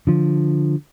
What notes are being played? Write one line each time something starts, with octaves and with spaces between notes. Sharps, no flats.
D3 F3